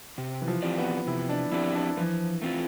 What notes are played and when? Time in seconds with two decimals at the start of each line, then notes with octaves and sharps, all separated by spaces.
0.18 C3
0.42 E3
0.48 F3
0.62 F3 C4 G4 D5
0.78 B3
1.07 C3 E4
1.29 D4
1.52 F3 C4 E4 G4 D5
1.75 D4
1.97 E3 F3
2.42 A3 C4 F4